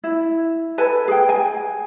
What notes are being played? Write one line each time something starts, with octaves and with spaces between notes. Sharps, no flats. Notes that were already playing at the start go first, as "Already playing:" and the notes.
E4
A4 B4 G#5 A5
G#4 G5
G#5